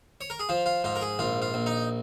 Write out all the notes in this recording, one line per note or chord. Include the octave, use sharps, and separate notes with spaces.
C#5
A#4
G#4
F3 F4
F4
G#2 F4
A#4
G#4
A#1 F4
F4
A#1
D#4